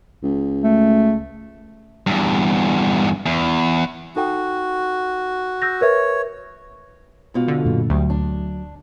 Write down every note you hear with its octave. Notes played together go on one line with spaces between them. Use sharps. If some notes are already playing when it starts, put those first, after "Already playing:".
C#2
A3
E2 G2
E2
D#4 F#4 A4 G5
E6 G6 A#6
A#4 B4 C#5 E5
G#2 B2 F4
D3
F#2 A#2
D2 F#3 G3
D4